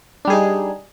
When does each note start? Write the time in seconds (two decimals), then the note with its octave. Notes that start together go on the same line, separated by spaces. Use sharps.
0.25 D4
0.27 G3
0.30 G#4
0.33 D#4